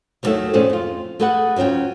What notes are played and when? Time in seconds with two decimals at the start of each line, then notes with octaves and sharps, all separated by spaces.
0.23 D#2 A#2 D#3 F#3 A3 E5
0.54 A#2 F3 A3 C4 C#4 G#4
0.70 F2 F4
1.20 A3 G#4 A4 B4 D#5 F#5
1.56 D2 F#3 C#4 F4 G5